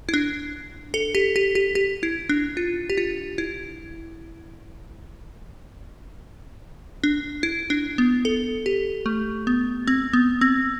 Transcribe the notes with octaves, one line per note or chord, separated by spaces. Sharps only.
E4
D4
A4
G4
G4
G4
G4
E4
D4
F4
G4
F4
E4
D4
E4
D4
B3
A4
G4
A3
B3
C4
B3
C4